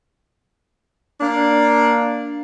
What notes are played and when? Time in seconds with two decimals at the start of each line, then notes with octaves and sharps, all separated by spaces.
1.21 A#3 D4